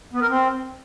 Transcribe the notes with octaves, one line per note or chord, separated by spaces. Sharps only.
B3
A#4
C4